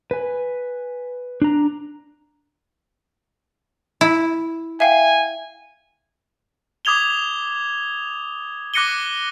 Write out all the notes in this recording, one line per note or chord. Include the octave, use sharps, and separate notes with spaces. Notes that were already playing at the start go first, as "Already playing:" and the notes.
B4 G#5
D4 A#5
E4
E5 F5 G5 G#5
D6 D#6 G#6 F7 G7
D6 F#6 A#6 C#7 D#7 G7